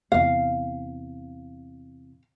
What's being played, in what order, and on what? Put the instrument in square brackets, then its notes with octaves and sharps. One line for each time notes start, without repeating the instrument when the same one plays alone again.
[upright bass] E2 C3 [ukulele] F5